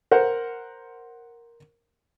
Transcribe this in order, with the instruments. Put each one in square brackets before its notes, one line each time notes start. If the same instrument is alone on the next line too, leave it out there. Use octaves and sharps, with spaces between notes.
[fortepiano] A#4 C5 F#5